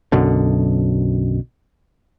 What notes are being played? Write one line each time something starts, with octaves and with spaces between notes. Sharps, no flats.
B1 F#2 B2 D3